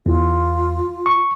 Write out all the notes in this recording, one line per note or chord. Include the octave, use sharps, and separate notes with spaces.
E2 F4
C#6